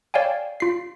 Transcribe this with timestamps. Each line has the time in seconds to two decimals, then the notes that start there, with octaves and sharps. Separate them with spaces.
0.14 C#5 D5 F5 G5 G#5
0.60 F4 C7